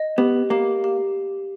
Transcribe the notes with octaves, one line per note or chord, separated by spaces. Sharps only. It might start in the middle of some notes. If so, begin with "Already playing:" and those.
Already playing: D#5
B3 G4
A#3 G4
G4